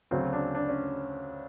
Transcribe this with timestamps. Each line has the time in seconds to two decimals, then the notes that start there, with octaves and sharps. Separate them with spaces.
0.11 D2 C#3 F#3 C4
0.33 D4
0.55 D4
0.69 C#4